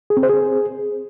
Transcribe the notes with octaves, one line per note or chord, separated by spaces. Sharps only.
G#4
C4
C5
G#4